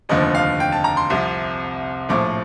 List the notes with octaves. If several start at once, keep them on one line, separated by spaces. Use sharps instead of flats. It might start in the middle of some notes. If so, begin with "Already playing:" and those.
F1 D#2 D3 F3 D#5
F5
G5
A5
A#5
C6
C2 C3 F3
A#1 A2 F3 D6